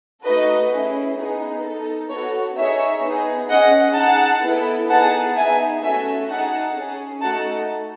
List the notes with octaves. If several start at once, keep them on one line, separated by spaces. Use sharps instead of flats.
A3 D#4 F#4 A4 B4 D#5
C#4 E4 G#4
B3 D#4 G#4
D#4 A4
B3 F#4 A4 C#5
D#4 G#4 C#5 E5
B3 D#4 G#4
C#4 G#4 D#5 F#5
D#4 G#4 F#5 A5
B3 E4 A4
B3 D#4 G#4 F#5 A5
B3 D#4 G#4 E5 G#5
A3 C#4 F#4 A4 E5 G#5
D#4 G#4 F#5 A5
C#4 G#4
A3 D#4 F#4 A4 F#5 A5